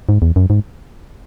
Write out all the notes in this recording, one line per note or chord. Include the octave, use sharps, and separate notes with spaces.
G#2
E2
F#2
G#2